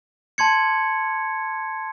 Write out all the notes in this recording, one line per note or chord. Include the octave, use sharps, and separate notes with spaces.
A5 C6 G#6 C#7